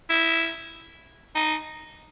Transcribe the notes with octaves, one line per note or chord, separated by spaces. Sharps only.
E4
D#4